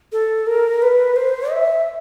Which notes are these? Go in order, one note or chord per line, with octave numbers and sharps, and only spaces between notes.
A4
A#4
B4
C5
E5